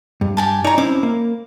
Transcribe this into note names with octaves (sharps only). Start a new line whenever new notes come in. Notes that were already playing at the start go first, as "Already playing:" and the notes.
G2
G4 G#5 A5
D#4 C#5 D5 A#5
C4 C#4 E4 D6
A#3